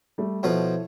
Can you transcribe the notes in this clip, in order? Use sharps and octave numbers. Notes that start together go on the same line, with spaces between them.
G3 A3
B2 F3 E4 F4 A4 C#5